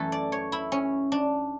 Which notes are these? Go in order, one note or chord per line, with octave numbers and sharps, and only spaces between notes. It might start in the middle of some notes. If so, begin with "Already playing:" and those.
Already playing: F#2 E3 A3 A4
D5
C#5
E4
C#4
D4